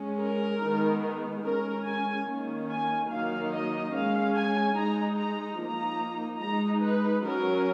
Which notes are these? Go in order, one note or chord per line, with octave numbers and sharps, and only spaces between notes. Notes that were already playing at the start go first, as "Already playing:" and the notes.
Already playing: G#3 C#4
A#4
D#3 G#3 B3 D#4
G#3 C#4 A#4
G#5
D#3 A#3 C#4
G#5
D#3 F#3 A#3 D#4 F5
D#5
G#3 C#4 F5
G#5
G#3 D#4 A#5
A#5
F3 A#3 D#4 A#5
G#3 D#4 A#5
B4
F#3 C#4 A#4